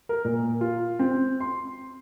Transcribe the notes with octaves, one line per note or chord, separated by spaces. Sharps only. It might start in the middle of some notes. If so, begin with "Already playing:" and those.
A#4
A#2
F4
C4
C6